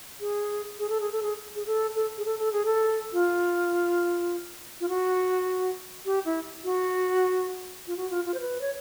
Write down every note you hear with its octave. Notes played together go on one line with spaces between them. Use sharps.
G#4
G#4
A4
G#4
A4
G#4
G#4
A4
A4
G#4
A4
A4
G#4
A4
F4
F4
F#4
G4
E4
F#4
F4
F#4
F4
F4
C5
B4
C#5